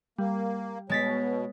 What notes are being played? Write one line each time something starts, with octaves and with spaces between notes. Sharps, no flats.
G3 A#3
B2 G#3 B3 C#5 A6 B6